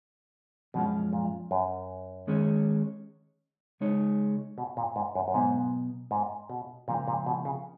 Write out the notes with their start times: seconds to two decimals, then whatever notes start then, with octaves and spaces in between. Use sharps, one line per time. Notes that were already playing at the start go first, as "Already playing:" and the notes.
0.74 F#2 B2 F3 G#3 C#4 F4
1.13 A#2
1.51 F#2
2.27 D#3 G#3 C#4 G#4 C#5
3.80 C#3 G#3 D#4 G#4 C#5
4.58 B2
4.77 A#2
4.96 G#2
5.15 F#2
5.28 F#2
5.34 G#2 B2 F#3 B3
6.11 G#2
6.50 B2
6.88 C#2 A#2 C#3 F3 A#3
7.08 A#2
7.26 B2
7.45 C#3